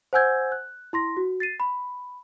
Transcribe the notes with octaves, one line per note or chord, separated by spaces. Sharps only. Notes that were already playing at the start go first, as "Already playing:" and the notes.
C5 F#5 G#5 E6 G6 G#6
F#6
E4 C6 A#6
F#4
A6 C7 D#7
B5